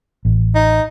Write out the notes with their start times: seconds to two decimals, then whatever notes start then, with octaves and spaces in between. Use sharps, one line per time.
0.25 A1
0.55 D#4